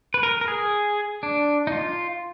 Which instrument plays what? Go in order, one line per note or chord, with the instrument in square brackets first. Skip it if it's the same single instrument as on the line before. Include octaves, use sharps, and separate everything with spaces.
[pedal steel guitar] B4
A#4
A#4
G#4
D4
D#4
F4